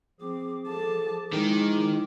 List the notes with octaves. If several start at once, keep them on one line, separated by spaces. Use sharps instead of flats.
F3 C4 G#4 D6
A4 A5
D#3 G#3 E4